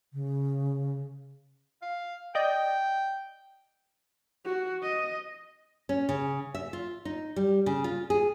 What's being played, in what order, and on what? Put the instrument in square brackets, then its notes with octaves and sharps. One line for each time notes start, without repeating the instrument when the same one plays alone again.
[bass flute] C#3
[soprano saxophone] F5
[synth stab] D5 D#5 G6 [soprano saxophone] G5
[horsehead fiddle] F#4
D#5
[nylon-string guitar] C#4
C#3
E5
F4
D#4
G3
C#3
F4
G#4